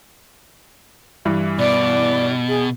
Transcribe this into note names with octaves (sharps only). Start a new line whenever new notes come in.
G2 E3
B2 D5
G#4